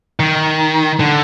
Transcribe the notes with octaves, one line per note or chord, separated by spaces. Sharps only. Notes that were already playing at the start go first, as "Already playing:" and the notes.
D#3
D3